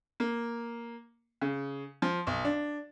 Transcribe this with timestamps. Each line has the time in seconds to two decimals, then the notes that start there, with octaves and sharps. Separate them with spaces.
0.20 A#3
1.42 C#3
2.02 F3
2.27 B1
2.45 D4